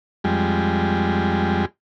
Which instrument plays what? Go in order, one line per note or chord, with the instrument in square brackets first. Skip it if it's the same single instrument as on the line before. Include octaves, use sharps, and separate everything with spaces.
[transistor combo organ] F2 G3 G#3